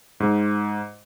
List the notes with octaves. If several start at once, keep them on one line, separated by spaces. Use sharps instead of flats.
G#2